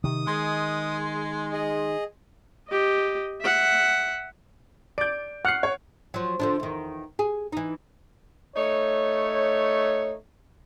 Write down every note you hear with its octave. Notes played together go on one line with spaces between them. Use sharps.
C3 D#3 D#6
G#3 C6
G#4 D#5
G4 D#5
E5 F#5
D5 G6 D7
F#5 F6 C7
C#5
F3 F#3
D3 F3 D4
E2 D#3
G#4
E3 D#4
A3 D#4 C#5